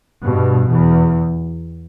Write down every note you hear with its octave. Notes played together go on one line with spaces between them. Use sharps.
G2 B2
E2